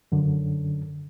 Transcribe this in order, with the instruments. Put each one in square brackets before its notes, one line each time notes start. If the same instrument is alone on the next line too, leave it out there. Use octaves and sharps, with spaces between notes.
[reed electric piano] F#2 D3